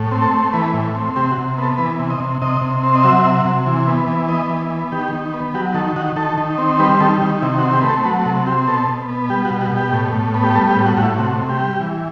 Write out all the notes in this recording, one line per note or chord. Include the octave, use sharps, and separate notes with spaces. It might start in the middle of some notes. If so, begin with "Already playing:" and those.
Already playing: A2
C4
A4
A3
E3 B4
A2
C4
C3 G4
F#4
C3
B3 A4
E3 B4
C3
D#5
C3
C3 D#5
C3
C4
D#5
F#3 E5
C3
C3
E3
B3
E3
B3 D#5
E3
B3
D#3 G4
D#3
B3
F#3 G4
D#3 A4
D#3 F#4
D#3 A4
D#3
C4
G3 B4
D#3 A4
D#3
C3 E4
F#4
C4
G4
A3 B4
A4
F#3 B4
C3 A4
C4 G4
B2 A4
B2
B3
G3 G4
F#4
B2
F#4
B2
G4
A2
A2
B3
G4
G3 A4
G4
A2
F#4
A2 F#4
E4
C3 F#4
C3
G4
G3
E3